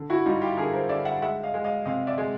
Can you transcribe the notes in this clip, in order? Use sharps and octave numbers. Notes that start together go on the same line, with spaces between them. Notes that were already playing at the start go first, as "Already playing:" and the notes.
Already playing: D3
E4 F#4
G3 D#4 F4
F4 G4
D3 G#4 A#4
A#4 C5
D3 D5 E5
E5 F#5
G#3 E5 F#5
D#5 F5
G#3
D#5 F5
C3 D#5 F5
D5 E5
G#3